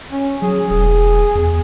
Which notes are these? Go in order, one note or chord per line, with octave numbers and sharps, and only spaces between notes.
C#4
F#3 G#4
E1 G#4
E2